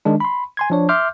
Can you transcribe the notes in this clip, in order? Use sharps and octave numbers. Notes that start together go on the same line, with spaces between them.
D#3 G#3 D4
B5 C6
G#5 C6 G#6
F3 D4 C#5
E5 C6 D6 F6 G6